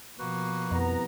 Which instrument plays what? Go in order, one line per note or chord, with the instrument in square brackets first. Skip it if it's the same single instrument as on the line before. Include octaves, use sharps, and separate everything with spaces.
[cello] B2 F3 [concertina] A#3 F#4 B4
[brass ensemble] C2 B3 A#5 [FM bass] F2